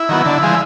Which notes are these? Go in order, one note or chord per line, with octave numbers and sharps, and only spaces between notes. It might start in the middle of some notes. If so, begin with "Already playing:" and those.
Already playing: E4
D#3 F#3 B3
D3
F3 G#3